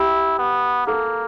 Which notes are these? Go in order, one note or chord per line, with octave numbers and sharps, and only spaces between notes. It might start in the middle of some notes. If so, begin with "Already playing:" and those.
Already playing: E4 G4
B3
A#3 A4